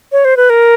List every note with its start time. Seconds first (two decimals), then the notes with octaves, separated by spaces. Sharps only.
0.12 C#5
0.25 C5
0.37 B4
0.50 A#4